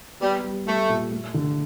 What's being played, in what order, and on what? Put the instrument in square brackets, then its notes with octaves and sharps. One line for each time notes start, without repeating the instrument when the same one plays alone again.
[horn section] G3 [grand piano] B3
[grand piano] G3
[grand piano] G3 [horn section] A3
[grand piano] A#2
A3
D3